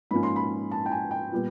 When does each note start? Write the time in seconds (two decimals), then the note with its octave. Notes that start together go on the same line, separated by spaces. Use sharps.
0.11 G#2 F3 A#3 C#4 B5
0.23 C6
0.36 B5
0.71 A5
0.86 G5
0.91 G#5
1.11 G5
1.32 A#2 G3 B3